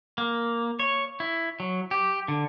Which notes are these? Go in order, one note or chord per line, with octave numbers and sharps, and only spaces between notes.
A#3
C#5
E4
F#3
G4
D3